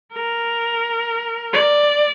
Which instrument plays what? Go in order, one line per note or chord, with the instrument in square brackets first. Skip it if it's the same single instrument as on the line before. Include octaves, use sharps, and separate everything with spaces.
[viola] A#4
D5